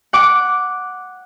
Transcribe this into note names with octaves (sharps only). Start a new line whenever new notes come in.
F#5 D6